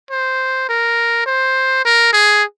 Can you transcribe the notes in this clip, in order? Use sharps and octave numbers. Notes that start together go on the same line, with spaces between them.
C5
A#4
C5
A#4
G#4